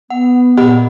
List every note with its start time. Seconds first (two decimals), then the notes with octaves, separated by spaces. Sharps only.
0.10 B3 F#5
0.57 A#2 G4 D#5 F#5 B5